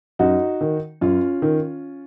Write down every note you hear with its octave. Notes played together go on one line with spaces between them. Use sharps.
F#2 D#4 F#4
D#3
F#2 C#4 F4
D#3